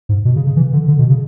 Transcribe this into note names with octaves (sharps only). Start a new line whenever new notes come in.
G#2
B2
C#3
C#3
E3
D3
D3
B2
C#3